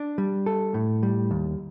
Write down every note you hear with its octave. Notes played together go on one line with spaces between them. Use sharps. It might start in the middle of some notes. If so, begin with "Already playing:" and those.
Already playing: D4
G3
A4
A2
G3
D#2